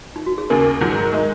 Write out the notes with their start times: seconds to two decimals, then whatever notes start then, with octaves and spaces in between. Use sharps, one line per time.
0.16 D#4
0.26 F#4
0.38 G#4
0.50 D#2 C#3 A#3 A#4
0.81 G#2 D#3 F#3 G#4
0.92 A#4
1.01 G#4
1.13 G#3 D#4 A#4